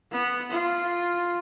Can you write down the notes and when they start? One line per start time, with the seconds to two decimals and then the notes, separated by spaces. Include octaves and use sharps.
0.12 B3
0.51 F4